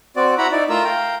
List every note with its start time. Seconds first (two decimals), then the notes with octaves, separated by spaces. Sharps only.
0.16 C4 F#4 D5
0.38 E4 F#4 F#5 A#5 B5
0.52 D#4 E4 D5
0.70 A3 F4 A#4 A#5 E6
0.84 F5 G5 A#5